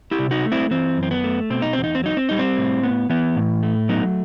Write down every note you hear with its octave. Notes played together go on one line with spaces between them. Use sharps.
E4 G4
C3
D#4 F#4
A3
C4 E4
E3 C4
F#2
C4
B3
A3
B2 C4
D#4
E2 C4
D#4
C4
F#3 D#4
C4
G3 D#4
C4
A2
B3
E3 B3
A2
A3
F#3 B3 D#4